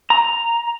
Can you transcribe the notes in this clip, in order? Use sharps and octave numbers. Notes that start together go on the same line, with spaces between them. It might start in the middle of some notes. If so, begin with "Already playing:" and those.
A#5